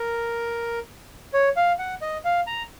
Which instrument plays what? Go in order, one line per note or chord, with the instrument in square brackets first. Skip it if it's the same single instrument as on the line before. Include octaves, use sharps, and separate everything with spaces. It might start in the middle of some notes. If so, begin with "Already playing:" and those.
Already playing: [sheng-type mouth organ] A#4
C#5
F5
F#5
D#5
F5
A#5